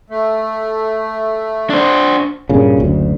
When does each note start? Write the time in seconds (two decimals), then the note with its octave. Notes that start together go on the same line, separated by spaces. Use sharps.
0.10 A3
1.70 D4 C5
2.49 G2 A#2 C#3
2.78 F#1 D2